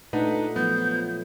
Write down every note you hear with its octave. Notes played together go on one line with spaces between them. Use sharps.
A#2 A3 D4 D#4 B4 F#5
F3 F#3 A3 B3 G6